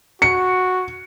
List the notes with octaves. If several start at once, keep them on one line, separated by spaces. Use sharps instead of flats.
F#4 C#7